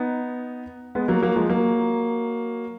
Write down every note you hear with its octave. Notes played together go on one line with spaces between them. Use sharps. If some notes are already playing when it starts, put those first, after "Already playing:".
Already playing: B3 D#4
G#3 B3
F#3 A#3
F#3 A#3
F3 G#3
F#3 A#3